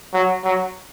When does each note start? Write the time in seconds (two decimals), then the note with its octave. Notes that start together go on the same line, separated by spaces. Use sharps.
0.13 F#3
0.44 F#3